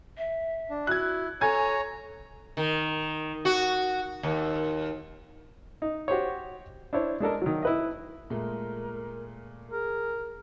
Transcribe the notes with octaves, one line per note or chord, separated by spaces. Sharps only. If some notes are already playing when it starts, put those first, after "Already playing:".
E5
D4
E4 F#4 F#6 G#6
A4 C#5 G#5 A#5 G#6
D#3
F#4
D#2
D#4
F#4 G4 C5 C#5
D4 E4 C5 C#5
G#3 D4 A4 A#4
D#3 F#3
E4 B4 D#5
A#2 G#3 A3 A#4
G#4 A#4